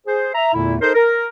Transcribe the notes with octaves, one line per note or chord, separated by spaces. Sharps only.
G#4 C5
E5 A#5
E2 A#2 D3 A3 E4
D#4 A4 A#4 C5
A#4